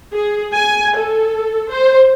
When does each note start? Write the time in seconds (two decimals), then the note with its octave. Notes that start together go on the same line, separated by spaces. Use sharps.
0.12 G#4
0.53 G#5
0.97 A4
1.69 C5